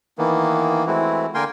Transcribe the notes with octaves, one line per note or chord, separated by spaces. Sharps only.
D#3 E3 A#3 B3
E3 G#3 A3 C4 E4 F#4
D3 A#3 A#4 G5 G#5 C6